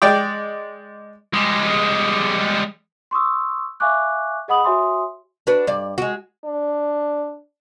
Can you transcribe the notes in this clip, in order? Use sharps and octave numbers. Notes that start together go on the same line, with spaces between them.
G#3 D5 G5 D6
G3 G#3
C6 C#6 D#6 E6
E5 F5 G#5 C#6 D6 F#6
G#4 D#5 F#5 B5 D#6 F#7
F#4 C#5 E5 G#5 C6 D#6
D4 F#4 B4
G2 D5
G#3 F#4
D4